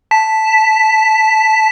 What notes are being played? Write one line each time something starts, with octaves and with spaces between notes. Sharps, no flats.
A5 B6